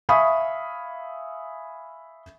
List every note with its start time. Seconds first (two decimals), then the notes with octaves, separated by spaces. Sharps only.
0.09 E5 F5 G#5 B5 C#6 D#6